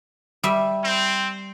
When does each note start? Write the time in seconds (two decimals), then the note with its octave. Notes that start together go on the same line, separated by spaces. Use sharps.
0.44 G3 E5
0.84 C4